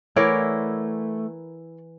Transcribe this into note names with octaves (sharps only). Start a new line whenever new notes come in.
E3 A3 E4 A#4 C#5 D5 F#5